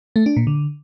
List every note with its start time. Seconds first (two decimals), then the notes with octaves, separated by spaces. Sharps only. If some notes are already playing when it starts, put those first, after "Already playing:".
0.16 A3
0.26 D4
0.37 A#2
0.47 D3